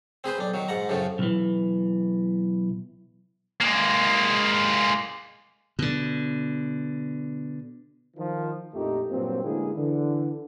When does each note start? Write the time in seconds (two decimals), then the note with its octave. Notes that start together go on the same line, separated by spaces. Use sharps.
0.24 C4 G#4 B4 C5
0.38 B1 D4
0.54 D#3 F#3
0.68 G#2 F#5 A#5
0.89 F#2 A2 C#3 F3
1.19 B1 E3
3.60 G#3 A#3
5.79 B2 D3
8.17 D#3 F3
8.74 A#1 F2 A#2 A3 D#4 G4
9.10 G2 A#2 F#3 C4
9.43 A1 D3 G#3 A#3 E4 G#4
9.76 D3 E3